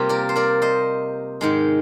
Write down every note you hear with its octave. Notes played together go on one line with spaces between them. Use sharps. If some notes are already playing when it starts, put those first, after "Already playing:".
Already playing: C3 G3 A#3 F4 G4
A#4 D5
C5
A#4 D5
C5 D#5
G#2 D#3 G#3